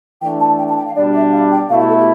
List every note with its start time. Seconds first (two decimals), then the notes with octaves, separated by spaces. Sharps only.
0.21 E3 A3 D4 G5
0.40 A5
0.58 G5
0.68 A5
0.77 G5
0.86 F5
0.95 B2 G3 D4 D5
1.14 E5
1.32 F5
1.51 G5
1.70 B2 A3 E4 F5
1.79 G4
1.88 A4
1.97 G4